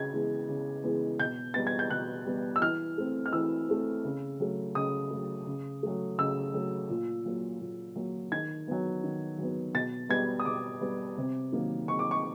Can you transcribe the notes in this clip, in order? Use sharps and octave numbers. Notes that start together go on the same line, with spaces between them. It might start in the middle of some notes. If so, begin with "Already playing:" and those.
Already playing: C#3 G#6
E3 G#3 B3
C#3
E3 G#3 B3
B2 G6
G3 B3 A6
G#6
G6
B2 F#6
G3 B3
E6
E3 F6
A3 C4
F6
E3 E6
A3 C4
C#3
F#3 A3
C#3 D#6
F#3 A3
C#3
F#3 A3
C#3 E6
F#3 A3
A#2
F#3 A#3
A#2
F#3 A#3
D#3 G#6
F#3 B3
D#3
F#3 B3
B2 A6
G3 B3 G#6
D#6
B2 D6
G3 B3
C3
D#3 F#3 A#3
C3 C#6
D6
C#6